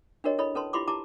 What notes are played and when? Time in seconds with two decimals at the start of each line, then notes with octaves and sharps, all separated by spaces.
0.24 D4 F#4 G4 A#4 C#5 D#5
0.38 E4 A4 C#5 D#5 B5
0.55 C#4 A4 B4 A5 C6
0.73 E4 F4 G4 B5 C6 D6
0.88 E4 G4 A5 A#5 D6